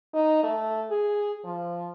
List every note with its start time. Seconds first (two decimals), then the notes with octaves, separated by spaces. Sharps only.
0.14 D#4
0.43 A3
0.90 G#4
1.45 F3